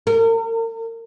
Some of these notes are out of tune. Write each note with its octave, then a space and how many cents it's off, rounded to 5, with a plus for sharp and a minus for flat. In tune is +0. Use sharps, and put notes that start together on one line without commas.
A#4 -40